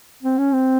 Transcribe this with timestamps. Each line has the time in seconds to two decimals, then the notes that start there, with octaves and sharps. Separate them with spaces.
0.23 C4
0.38 C#4
0.53 C4